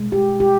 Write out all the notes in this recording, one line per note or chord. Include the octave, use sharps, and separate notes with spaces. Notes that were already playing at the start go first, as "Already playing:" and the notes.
Already playing: B2 G#3
G4
G4